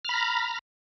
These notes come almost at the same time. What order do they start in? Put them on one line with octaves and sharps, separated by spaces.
F6 B5 A#5